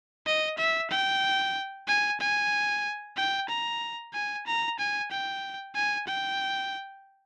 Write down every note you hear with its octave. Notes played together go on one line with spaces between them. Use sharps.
D#5
E5
G5
G#5
G#5
G5
A#5
G#5
A#5
G#5
G5
G#5
G5